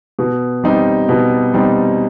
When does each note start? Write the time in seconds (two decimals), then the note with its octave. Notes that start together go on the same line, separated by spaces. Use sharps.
0.19 B2
0.64 G3 C4 D#4
1.09 B2
1.54 G3 C4 D#4